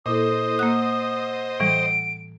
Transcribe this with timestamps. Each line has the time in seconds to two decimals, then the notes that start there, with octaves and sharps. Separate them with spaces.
0.06 A#2 A#3 E4 A4 C5 D#5 D#6
0.59 A#3 F#5 E6 F#6
1.60 A2 E3 G3 D7